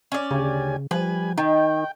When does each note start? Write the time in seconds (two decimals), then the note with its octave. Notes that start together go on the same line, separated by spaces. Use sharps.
0.12 C#4 D5
0.31 D2 C#3 G4 G#5
0.91 F3 G3 B4 G#5
1.38 D#3 D#4 G5